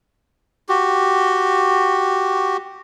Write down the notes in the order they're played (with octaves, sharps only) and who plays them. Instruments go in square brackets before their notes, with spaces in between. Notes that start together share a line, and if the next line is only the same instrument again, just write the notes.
[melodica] F#4 G4